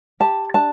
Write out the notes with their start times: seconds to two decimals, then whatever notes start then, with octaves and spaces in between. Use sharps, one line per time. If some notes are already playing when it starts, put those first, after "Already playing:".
0.20 G4 A5
0.54 D4 A5